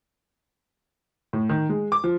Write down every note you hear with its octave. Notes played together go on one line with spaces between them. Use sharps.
A2
D#3
G#3
D6
F3